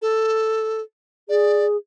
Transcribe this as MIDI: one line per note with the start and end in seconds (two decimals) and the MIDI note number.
0.02 0.81 69
1.29 1.77 68
1.29 1.65 74